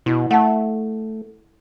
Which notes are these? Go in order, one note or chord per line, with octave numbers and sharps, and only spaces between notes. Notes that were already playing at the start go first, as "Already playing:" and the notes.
B2 E4
A3 F#5 A5